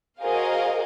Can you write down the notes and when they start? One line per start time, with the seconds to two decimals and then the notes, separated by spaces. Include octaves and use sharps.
0.20 F#4 G#4 A#4 C5 D#5 F5